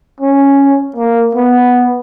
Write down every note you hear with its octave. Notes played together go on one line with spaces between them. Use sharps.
C#4
A#3
B3